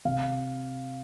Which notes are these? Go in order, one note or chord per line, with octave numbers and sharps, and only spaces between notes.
C3 F5